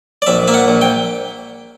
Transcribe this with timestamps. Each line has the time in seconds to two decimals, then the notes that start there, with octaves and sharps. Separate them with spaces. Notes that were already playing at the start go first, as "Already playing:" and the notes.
0.22 D5
0.27 A#1 E5
0.48 A#3 E5
0.54 F#5
0.68 A#1
0.81 G5